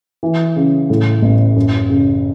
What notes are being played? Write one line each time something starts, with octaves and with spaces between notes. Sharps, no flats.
E3
C#3
A2
A1
F#2
C#3